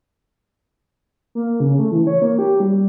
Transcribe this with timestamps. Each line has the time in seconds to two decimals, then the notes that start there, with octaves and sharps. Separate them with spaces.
1.35 A#3
1.60 C#3
1.79 A3
1.92 E3
2.07 C#5
2.22 A#3
2.39 G4
2.60 G3